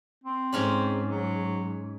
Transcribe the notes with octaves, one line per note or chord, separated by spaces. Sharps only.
C4
G#2 C#4 D5
F#3